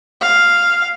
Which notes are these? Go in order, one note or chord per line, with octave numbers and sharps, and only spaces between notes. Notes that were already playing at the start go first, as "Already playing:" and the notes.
F5